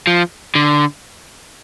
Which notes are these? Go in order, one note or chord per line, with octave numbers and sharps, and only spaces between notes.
F3
D3